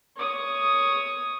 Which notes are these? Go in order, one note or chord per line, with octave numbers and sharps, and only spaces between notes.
C#5 D#6